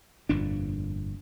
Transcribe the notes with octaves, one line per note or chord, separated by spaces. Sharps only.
G1 F2 A#2 D4